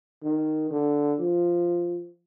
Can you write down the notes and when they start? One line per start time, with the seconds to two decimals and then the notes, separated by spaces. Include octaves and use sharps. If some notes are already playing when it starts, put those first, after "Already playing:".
0.23 D#3
0.71 D3
1.19 F3